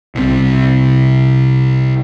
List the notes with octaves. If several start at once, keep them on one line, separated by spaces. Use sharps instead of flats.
C2 C3